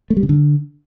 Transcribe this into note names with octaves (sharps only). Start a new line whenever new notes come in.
A3
G3
C#3
D3